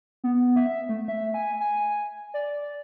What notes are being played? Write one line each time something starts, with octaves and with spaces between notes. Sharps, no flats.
B3
E5
A3
E5
G#5
G#5
D5